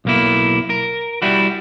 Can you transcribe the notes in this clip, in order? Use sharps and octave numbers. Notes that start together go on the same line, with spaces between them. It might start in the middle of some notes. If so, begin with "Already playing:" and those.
B1 A#3 E4
A#4
G3 E4 F#4